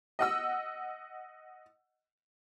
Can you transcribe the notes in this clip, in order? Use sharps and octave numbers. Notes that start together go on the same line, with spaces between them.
D#5 F#5 E6